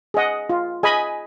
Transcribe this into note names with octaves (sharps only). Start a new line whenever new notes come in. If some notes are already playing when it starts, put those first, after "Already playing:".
G#4 D#5 F#5
F4
G#4 D#5 G#5 B5